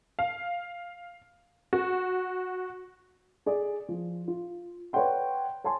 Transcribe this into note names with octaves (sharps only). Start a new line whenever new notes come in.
F5
F#4
G#4 D5
F3
F4
B4 C#5 D5 F#5 G5 C6
C#5 G#5 A5 C6